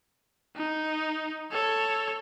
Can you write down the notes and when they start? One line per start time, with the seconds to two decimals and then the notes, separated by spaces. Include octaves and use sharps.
0.56 D#4
1.52 A4 C#5